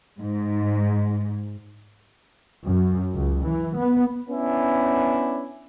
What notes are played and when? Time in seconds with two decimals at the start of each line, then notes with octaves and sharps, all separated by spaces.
0.19 G#2
2.65 F#2
3.13 C#2
3.45 E3
3.76 B3
4.30 B3 C#4 D4 E4